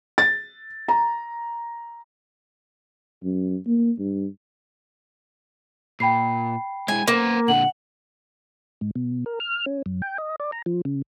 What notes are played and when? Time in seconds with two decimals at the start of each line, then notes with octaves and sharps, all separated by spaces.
0.18 A6
0.88 A#5
3.23 F#2
3.67 A#3
3.99 G2
6.00 A#2 G5 B5 C7
6.88 G#3 E4 G#5
7.08 A#3 B3 C5
7.48 A#2 D3 F#5 F#7
8.81 G#2
8.95 B2
9.26 A#4
9.40 F6
9.66 C#4
9.86 F#2
10.02 G5
10.18 D#5
10.40 D5
10.52 A#5
10.66 F3
10.85 C#3